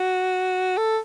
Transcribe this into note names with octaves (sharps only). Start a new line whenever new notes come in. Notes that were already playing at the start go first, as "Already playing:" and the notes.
Already playing: F#4
A4